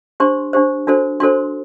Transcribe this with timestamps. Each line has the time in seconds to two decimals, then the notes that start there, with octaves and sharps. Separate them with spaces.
0.20 D4 G4 C5 C6
0.53 D4 G4 C5
0.87 D4 F#4 A4 C5
1.20 D4 F#4 A4 C5 C6